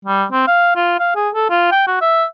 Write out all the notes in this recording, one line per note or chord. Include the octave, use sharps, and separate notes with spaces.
G3
C4
F5
F4
F5
G#4
A4
F4
G5
F#4
E5